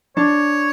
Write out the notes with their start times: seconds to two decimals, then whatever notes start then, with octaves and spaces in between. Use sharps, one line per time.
0.17 D4 C#5